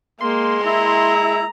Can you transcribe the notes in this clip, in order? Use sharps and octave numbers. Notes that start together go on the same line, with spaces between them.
G#3 A#3 C6
E4 A#5